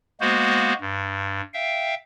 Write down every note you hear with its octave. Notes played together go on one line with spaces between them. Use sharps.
G#3 A#3 B3 F#4 C5
G2
E5 F5 G5